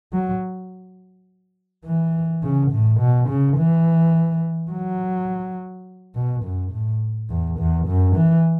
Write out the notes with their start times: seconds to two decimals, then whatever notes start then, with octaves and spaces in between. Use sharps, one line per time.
0.13 F#3
1.85 E3
2.43 C#3
2.71 A2
3.00 B2
3.29 C#3
3.58 E3
4.71 F#3
6.15 B2
6.44 F#2
6.72 A2
7.30 E2
7.59 E2
7.88 F#2
8.16 E3